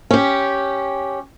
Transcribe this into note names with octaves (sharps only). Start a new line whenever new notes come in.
C#4 G4